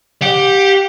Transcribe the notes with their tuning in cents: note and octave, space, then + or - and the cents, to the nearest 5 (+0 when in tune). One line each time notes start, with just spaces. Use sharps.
G4 +0 F#5 -35